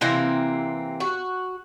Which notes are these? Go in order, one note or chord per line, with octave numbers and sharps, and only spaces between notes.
C3 E3 A#3 C4
F#4